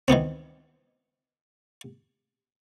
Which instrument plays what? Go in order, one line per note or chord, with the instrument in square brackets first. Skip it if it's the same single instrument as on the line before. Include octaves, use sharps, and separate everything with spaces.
[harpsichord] D#3 E3 B3 C4